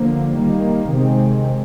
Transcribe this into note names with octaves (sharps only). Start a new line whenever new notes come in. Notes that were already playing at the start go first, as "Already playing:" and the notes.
Already playing: D3 F3 A#3
D#3 G3 A#3
C3 D#3 G#3 C4